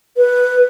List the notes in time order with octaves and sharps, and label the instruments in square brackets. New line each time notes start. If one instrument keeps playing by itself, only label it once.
[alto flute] B4